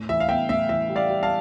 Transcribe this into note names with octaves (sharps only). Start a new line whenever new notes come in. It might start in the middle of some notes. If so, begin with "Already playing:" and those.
Already playing: A2
E3 E5
F5
B3 E5 G5
A2 E5
E3 E5
G3
D5 F5
G3
F5 A5